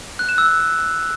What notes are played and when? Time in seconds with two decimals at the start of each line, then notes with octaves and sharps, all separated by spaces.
0.19 F#6
0.29 E7
0.38 E6